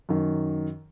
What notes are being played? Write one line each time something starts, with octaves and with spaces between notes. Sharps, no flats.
F#2 D#3